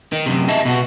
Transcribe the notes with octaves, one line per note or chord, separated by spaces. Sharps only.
D#3
F#2 C3
D#5 E5 A5
B2 F#4